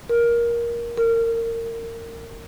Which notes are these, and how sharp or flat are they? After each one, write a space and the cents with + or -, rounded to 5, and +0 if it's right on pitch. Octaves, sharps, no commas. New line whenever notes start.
A#4 +15
A#4 -25